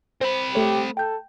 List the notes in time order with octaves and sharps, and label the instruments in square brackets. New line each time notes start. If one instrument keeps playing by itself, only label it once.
[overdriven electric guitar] C4 B5 [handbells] C5
[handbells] A3 A4 C#5 [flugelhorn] G4
[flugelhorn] A4 [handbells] G5 G6